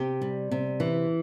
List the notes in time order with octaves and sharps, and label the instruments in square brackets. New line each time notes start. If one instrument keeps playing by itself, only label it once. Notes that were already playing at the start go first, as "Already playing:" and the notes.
Already playing: [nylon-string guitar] C3 G4
G3
C3
E3